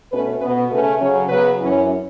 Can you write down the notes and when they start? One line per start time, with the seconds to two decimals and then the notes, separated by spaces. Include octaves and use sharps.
0.11 B2 A3 C#4 B4
0.41 B2 B3 B4
0.70 C#3 A3 C#4 B4
1.00 C#3 F#3 C#4 C#5
1.29 C#3 F#3 B3 B4
1.59 F#2 E3 C#4